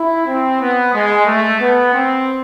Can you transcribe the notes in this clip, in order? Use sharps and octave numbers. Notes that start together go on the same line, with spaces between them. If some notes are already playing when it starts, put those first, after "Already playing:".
Already playing: E4
C4
B3
G#3
A3
B3
C4